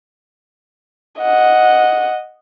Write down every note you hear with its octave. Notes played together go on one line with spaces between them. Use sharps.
D#5 F#5